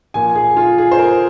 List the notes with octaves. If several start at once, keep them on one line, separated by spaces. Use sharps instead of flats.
A#2 F3 A#3 G#5
G#4
F4
G#4
C5
A#4